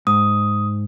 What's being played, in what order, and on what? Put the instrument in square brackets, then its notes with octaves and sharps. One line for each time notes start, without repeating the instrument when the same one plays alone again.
[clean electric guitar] G#2 [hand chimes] D#6